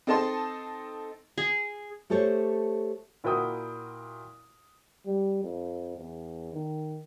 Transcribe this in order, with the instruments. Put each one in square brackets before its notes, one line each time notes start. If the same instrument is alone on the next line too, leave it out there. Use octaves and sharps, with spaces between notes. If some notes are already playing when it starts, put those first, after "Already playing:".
[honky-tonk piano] C4 D#4 A4 D#5 A5 C6
[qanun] G#4
[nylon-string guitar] A3 G4 A4 C5 C#5
[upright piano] A#2 E4 F#4 A#4 G5 D#6
[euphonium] G3
F2
E2
D#3